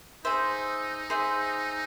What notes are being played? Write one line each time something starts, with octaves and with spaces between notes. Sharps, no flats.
D#4 G#4 C5 E5
G#4 C5 E5